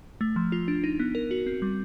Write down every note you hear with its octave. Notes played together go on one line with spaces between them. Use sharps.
A3
F3
F4
D4
D#4
B3
A#4
F#4
C4
G3